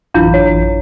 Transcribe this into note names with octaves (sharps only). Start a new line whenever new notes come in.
A1 F#2 E3 D4 E4 F4 F5 G6
C#5